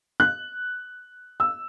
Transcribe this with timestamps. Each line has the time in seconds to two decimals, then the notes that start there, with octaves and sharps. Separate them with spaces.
0.20 F#6
1.40 E6